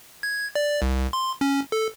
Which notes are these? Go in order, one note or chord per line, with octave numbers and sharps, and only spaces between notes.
G#6
D5
C2
C6
C#4
A4